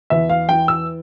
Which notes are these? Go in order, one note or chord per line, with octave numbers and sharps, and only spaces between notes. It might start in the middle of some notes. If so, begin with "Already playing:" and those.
E2 E5
F5
E3 G5
E6